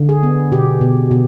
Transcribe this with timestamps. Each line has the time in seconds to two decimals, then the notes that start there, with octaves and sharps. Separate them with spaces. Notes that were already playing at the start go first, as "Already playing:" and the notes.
Already playing: D3
0.09 G#4
0.23 B3
0.52 B2 G4
0.81 B2
1.11 B2